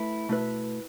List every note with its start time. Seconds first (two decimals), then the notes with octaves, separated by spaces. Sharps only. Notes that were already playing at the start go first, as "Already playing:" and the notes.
Already playing: A3 E4 B4
0.29 B2 A3 E4 B4